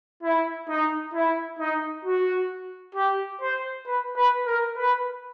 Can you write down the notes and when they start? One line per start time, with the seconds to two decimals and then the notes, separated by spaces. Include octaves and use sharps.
0.23 E4
0.69 D#4
1.14 E4
1.59 D#4
2.05 F#4
2.95 G4
3.41 C5
3.87 B4
4.16 B4
4.46 A#4
4.77 B4